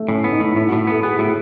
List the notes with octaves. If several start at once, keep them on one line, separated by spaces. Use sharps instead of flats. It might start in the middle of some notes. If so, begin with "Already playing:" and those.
Already playing: A3
A2 C#4
B3
D#4
A2
A2 E4
A2 F#4
B3 A4
B3 G#4
A2 F#4